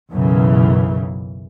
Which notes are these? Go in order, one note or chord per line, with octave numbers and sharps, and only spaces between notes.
B1 F#2 C#3 E3